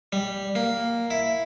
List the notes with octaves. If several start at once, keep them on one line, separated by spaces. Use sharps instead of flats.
G3
A#3
E4